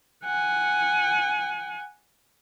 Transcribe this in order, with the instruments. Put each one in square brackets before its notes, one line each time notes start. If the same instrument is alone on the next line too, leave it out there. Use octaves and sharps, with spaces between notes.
[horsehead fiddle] F#5 G#5